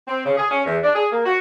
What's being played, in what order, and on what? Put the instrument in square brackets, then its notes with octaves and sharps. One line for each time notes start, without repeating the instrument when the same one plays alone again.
[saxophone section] C4
C#3
G#4
C#4
E2
D4
G#4
A#3
F#4